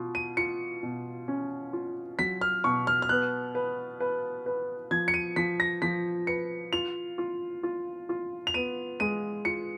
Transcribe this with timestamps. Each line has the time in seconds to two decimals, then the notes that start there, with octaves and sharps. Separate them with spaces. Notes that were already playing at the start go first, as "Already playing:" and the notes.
Already playing: B2 F4
0.15 D#7
0.37 F4 C#7
0.83 B2
1.28 C#4
1.73 F4
2.19 F#3 B6
2.41 F6
2.64 B2 C#6
2.87 F6
3.02 F6
3.09 B3 F#6
3.55 B4
4.00 B4
4.46 B4
4.91 F3 G#6
5.08 C#7
5.14 D#7
5.36 F3 B6
5.60 A#6
5.82 F3 B6
6.27 B4 C#7
6.73 F4 F7
7.18 F4
7.63 F4
8.09 F4
8.47 F7
8.54 B3 D#7
9.00 G#3 D#7
9.45 F4 C#7